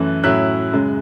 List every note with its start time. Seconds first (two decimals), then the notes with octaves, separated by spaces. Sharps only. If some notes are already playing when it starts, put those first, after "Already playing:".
Already playing: F#2 E3 A3 F#6
0.23 A2 F#3 C#4 E4 F#6
0.73 F#2 C#3 G#3